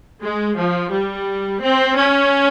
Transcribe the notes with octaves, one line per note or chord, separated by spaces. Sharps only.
G#3
F3
G3
C4
C#4